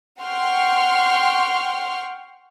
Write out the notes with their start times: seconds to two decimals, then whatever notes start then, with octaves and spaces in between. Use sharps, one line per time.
0.21 F#5 G5 C6 C#6 F6